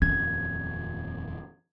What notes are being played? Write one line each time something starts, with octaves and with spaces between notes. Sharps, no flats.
D#1 F2 C#4 G#6